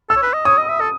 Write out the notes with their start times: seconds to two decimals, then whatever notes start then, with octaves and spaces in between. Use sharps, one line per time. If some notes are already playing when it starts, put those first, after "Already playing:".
0.10 A4 E6
0.16 C#5
0.22 B4
0.33 D#5
0.45 C#5 D#6
0.58 D#5
0.69 E5
0.80 A4